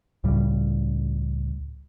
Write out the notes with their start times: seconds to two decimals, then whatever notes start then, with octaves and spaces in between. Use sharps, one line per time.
0.24 C#2 A2 C#3 G3